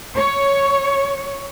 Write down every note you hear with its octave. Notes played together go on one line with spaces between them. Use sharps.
C#5